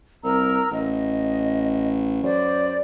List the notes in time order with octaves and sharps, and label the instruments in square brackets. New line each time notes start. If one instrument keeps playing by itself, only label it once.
[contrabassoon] C2 [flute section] A#4 A#5 E6
[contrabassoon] A1 [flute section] D#5
[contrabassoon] F#2 [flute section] C5 D5